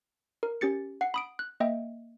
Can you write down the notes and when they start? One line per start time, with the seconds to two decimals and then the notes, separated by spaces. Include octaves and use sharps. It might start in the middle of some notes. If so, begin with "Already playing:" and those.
0.43 A#4
0.61 C#4 G4 A6 C#7
1.01 F#5 C7
1.14 B5 D#6 D7
1.39 F#6
1.60 A#3 D#5 E5 G5